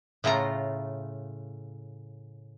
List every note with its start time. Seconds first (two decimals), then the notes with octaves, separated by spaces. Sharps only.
0.24 A2 C#3 A3 F4 A#5